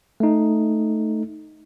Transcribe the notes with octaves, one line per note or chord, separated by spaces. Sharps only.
A3 D#4